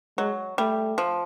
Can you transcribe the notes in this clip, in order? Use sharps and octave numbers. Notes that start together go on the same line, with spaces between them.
F#3 G#3
G3 A3
F3